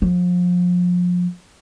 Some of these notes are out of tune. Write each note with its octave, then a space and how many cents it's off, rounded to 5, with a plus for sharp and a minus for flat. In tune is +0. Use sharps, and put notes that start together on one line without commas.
F3 +30